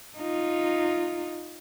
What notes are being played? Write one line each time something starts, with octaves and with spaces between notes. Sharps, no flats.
D#4 F4